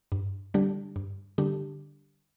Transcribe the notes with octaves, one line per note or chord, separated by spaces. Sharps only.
G2
D3 G3 D4 G4
G2
D3 G3 D4 G4